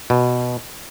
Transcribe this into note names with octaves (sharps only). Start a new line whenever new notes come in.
B2